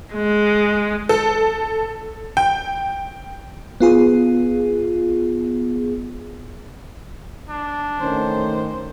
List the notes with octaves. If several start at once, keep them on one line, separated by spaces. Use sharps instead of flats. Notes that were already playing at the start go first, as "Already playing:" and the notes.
G#3
A4
G5
B3 F4 G#4
D4
D#3 A3 C#4 C5